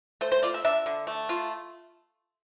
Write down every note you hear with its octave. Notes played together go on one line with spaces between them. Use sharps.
A3 C5
C5
F4 D5
E5
D4 E5
D3
A3
F4